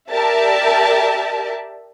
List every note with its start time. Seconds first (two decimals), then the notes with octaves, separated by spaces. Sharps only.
0.12 G4 A#4 D5 E5 A5